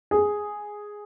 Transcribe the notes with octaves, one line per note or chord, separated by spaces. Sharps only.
G#4